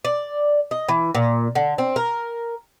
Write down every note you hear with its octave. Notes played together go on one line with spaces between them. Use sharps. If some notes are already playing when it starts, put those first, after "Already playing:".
D5
D#5
E3
A#2
D3
C4
A#4